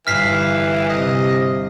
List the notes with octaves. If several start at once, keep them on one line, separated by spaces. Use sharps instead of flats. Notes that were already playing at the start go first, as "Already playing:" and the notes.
G1 G2 E3 E4 F6 B6 C7
C3 D#5